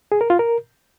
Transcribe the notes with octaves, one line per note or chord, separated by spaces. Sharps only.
G#4
A#4
F4
A#4